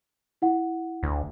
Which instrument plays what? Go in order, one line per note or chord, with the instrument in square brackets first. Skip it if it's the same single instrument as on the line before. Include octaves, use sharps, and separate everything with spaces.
[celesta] E4 F#5
[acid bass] D2